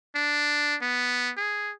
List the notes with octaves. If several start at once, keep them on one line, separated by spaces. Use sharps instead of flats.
D4
B3
G#4